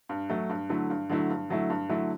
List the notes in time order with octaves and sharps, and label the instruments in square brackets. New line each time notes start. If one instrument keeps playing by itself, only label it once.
[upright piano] G2
F#3 A3
G2
D3 F#3 A3 E4
G2
D3 F#3 A3 E4
G2
D3 F#3 A3 E4
G2
D3 F#3 A3 E4